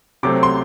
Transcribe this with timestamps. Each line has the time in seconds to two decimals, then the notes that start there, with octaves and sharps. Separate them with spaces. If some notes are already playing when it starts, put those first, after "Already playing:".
0.23 C3 F#3 A3 C4 D6
0.43 C6